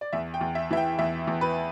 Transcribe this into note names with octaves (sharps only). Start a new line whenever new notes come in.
D5
E2 E5
G5
E2
E5
E3 E5
G5
E2 E5
E2
B4